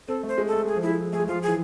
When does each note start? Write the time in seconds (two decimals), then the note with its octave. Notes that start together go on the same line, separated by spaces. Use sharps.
0.08 C4 A4
0.23 A3
0.28 C5
0.38 G#3
0.48 A4
0.53 A3
0.65 G#3 G#4
0.76 F3
0.83 G#3 E4
1.13 A3 G#4
1.20 G#3
1.28 F3 F4
1.43 G#4
1.48 E3